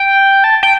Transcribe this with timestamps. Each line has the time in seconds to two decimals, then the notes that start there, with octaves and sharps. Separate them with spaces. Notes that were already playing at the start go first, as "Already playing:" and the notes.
Already playing: G5
0.44 A5
0.63 G5